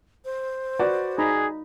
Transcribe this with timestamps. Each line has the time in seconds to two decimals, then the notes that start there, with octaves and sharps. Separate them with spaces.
0.25 C5
0.79 F#4 B4 D5
1.18 D#4 G#4 A#5 B5